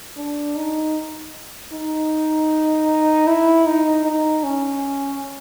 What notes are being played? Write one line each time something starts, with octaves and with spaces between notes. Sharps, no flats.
D4
D#4
D#4
E4
D#4
D#4
C#4